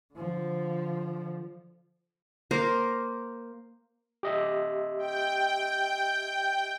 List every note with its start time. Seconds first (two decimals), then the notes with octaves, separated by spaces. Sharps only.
0.14 D3 F3
2.51 A#3 A#4 C5
4.23 G4 D#5 E5
4.99 G5